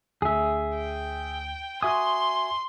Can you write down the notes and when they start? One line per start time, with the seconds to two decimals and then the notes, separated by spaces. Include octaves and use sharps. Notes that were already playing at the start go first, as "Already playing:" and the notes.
0.22 D2 G#4 E5
0.77 G5
1.83 F#4 E5 G#5 C6 D#6